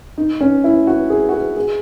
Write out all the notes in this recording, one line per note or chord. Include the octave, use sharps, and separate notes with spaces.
D#4
C#4
E4
F#4
G#4
F#4
G#4
G#4